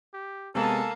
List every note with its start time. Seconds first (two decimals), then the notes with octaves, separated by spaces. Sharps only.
0.14 G4
0.55 C3 G#3 A#3 B3 A4 G#5 A5